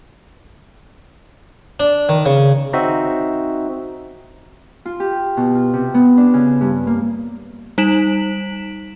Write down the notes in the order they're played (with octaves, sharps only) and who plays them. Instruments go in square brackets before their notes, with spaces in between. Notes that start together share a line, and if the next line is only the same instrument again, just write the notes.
[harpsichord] D4
D#3
C#3
[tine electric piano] C4 D#4 F#4 E5
[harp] F4
G4
B2
F4
C3
B3
D4
C#3
G2
A#3
[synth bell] G3 D#4 B6 D7 E7 F#7